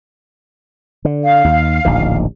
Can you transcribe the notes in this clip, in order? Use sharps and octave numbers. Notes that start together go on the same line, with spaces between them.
D3
F5
D#2
D1 A#1 D#3